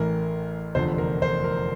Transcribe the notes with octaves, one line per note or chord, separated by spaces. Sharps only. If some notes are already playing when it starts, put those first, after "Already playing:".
Already playing: A1 A2 E3 A#4
F1 E2 D3 F3 C5
A#4
C5
A#4